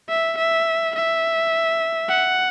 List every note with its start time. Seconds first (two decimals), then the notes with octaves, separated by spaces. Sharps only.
0.09 E5
0.38 E5
0.95 E5
2.09 F#5